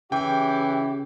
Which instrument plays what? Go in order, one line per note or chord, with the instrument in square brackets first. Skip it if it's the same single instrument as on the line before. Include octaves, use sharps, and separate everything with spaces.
[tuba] C#3 [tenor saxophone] E3 [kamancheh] G4 [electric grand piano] G5